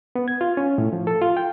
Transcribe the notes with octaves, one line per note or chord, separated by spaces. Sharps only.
B3
G#6
F4
C#4
A2
F3
A4
F4
G5